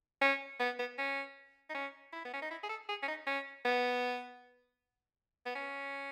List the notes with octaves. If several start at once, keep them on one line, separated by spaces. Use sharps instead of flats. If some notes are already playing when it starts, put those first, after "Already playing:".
C#4
B3
B3
C#4
D#4
C#4
E4
B3
C#4
D#4
E4
G#4
A4
G#4
C#4
D#4
C#4
B3
B3
C#4